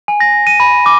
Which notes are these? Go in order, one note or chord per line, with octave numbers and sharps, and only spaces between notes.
G#5
A#6
D#7
B5
D6